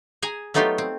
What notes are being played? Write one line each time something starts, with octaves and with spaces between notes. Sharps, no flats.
G#4 G#5 A#5
F#3 A3 B3 D#4 F4 G4
C4